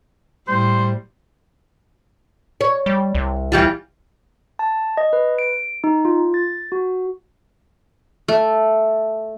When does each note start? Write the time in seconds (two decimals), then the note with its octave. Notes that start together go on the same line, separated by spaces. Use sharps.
0.48 A2 G3 C5
2.61 C#5
2.86 G3
3.15 C2
3.52 E3 G3 F4
4.59 A5
4.97 D#5
5.13 B4
5.39 D7
5.84 D#4
6.05 F4
6.34 A6
6.72 F#4
8.28 A3